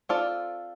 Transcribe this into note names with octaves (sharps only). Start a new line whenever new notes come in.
C4 F4 A4 D5